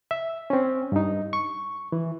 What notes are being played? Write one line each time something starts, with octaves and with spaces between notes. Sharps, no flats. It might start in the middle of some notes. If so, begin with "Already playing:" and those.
E5
C4 C#4
G2 D#4
C#6
E3